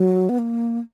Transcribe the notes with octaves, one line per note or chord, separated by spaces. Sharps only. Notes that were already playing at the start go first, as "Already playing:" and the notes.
Already playing: F#3
B3
A#3